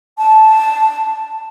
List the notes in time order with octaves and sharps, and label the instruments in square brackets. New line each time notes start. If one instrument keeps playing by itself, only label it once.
[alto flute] A5